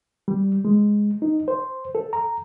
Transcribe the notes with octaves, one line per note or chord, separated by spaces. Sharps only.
G3
G#3
D#4
C5
A4
A#5